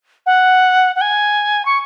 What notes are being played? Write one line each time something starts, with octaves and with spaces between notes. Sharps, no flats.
F#5
F#5
G#5
C#6